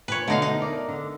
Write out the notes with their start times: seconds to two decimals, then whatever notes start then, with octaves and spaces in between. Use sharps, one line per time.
0.08 A#2 B4 C#5
0.28 B2 D3 A3 D#4 F5
0.42 D#4
0.62 A#4 D5
0.88 D3